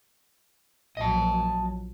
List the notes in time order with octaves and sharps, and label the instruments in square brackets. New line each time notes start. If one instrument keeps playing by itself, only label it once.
[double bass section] A#1 F#3 [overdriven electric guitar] D#5 A5